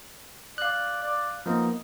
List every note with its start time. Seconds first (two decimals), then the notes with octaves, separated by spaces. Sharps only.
0.58 D5 F5 F#6
1.03 D5
1.46 F3 A#3 B3 D#4